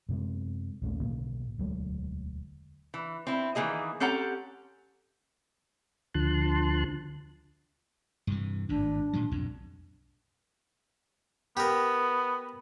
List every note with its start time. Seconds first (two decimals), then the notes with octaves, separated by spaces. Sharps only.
0.09 F#2 C3 G#3
0.82 A#1 D#2 A3 C#4
1.00 B1 A2 D3 A#3
1.58 E1 D2 F#3 G#3
2.94 E3
3.27 C4 E4
3.55 D#3 E3 A#3 G#4 D#5
4.00 C4 C#4 G4 A4 F#5 A#5
6.14 D2 D3 F3 A5 C6 F#6
8.27 G2 C3 E3
8.69 G#1 A2 D4
9.13 A#2 D#3 F#3
9.32 B1 F2 G#2
11.57 B3 G4 A#4